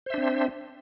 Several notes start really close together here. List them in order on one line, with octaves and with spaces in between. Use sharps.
C5 E5 D4 C4